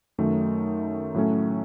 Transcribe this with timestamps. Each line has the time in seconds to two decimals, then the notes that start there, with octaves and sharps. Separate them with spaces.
0.18 F#2 D#3 F#3 A3
1.14 A2 F#3 A3 C#4